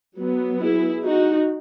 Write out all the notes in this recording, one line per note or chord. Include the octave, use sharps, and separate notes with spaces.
F#3 B3
E4 G#4
D#4 F#4